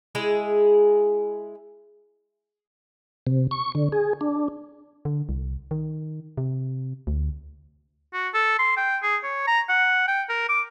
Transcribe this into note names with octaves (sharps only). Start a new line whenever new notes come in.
G#3 E4 G#4
C3
C#6
D3
G#4
D4
D3
C2
D#3
C3
D2
F#4
A4
C6
G5
G#4
C#5
A#5
F#5
G5
A#4
D6